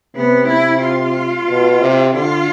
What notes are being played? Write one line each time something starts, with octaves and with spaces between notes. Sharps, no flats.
C3 B3
E4
F4
B2
C3
D3 F4